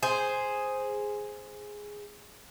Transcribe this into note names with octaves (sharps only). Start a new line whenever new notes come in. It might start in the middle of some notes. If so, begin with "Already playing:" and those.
G#4 C5